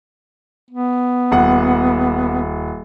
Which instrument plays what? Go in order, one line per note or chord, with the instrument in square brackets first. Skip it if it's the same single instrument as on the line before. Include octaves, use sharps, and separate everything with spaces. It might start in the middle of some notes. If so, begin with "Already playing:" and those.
[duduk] B3
[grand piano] D#1 F#5